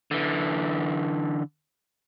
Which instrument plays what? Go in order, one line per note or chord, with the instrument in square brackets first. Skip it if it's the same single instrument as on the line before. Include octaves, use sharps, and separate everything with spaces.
[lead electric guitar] D3 E3